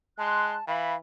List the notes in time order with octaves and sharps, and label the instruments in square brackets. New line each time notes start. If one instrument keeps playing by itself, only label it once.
[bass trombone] G#3 [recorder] A5 [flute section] C6 F#6
[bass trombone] E3 [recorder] F5 [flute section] B5